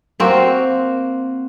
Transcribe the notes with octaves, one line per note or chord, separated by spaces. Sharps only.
A#3 C4 F#4